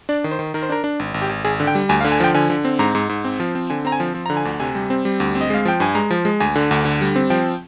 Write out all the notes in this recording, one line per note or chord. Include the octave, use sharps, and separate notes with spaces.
D4 D5
D#3
C5
D#3
D#3 A#4
C5
D4 A#4
D4
G#1
G#1
G4
G#1
G#1 G#4
D3
G5
G3
D2 G#5
F5
D3
G#5
F3 G5
D3 G#5
D3
C4
G#2 A#5
G#2
G#2
C4
F3
C4
D3 G#5
C4 A#5
G#5
F3
F3
D3 A#5
G#5
D2
C3 G#5
G3
C4
G3
D2
C4
D#5
G#3 F5
F3 G5
G2 G#5
G#3 A#5
F3
G#3
D2 G#5
D3
D2
D3
G3
C4
F3 G5